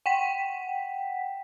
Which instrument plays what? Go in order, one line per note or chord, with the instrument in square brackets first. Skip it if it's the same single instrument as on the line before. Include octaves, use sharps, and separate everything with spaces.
[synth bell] F#5 G5 B6